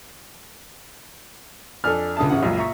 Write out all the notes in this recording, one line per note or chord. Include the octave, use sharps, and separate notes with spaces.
F2 D4 A4 G#5 F6
C#2 D3 E5 A5 D#6
A1 C#3 F#5
C#2 F#2 A#2
E5 A#5 C#6